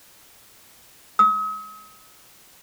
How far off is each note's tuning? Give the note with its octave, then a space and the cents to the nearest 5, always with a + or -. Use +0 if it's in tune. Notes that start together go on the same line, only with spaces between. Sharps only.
D#6 +45